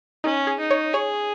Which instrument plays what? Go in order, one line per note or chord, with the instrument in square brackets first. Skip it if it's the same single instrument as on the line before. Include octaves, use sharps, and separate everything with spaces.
[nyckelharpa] C#4 [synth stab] D#4
[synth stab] G#4
[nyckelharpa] D#4
[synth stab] C#5
[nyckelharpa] G#4 [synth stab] C#5